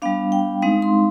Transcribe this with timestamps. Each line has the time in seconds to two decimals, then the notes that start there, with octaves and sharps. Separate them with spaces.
0.02 G3 B3 D4 F5
0.32 G5
0.62 G#3 C4 D#4 F5
0.82 C6